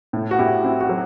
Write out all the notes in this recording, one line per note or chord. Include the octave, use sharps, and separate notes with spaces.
A2
F#4
A2 E4 G4
C4 E4
F#4
F#3